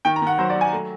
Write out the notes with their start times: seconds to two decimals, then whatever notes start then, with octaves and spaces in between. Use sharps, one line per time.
0.05 D#3 G5
0.16 A#5
0.22 D#3 F#5
0.38 F#3 C5
0.50 D5
0.55 F#3
0.61 G#5
0.72 A3